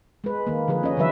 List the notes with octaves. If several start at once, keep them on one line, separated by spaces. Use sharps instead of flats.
G#3 B4
D#3 A#3
D3 F3 G#4 B4
C#4 D#5
D3 E3 F#3 B4 E5